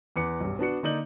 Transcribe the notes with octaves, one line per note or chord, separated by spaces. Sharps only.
E2 B4 D6 C#7
B1 G2
B3 D4 F#4 C#7
D3 A#3 D#4 D5 G6 F#7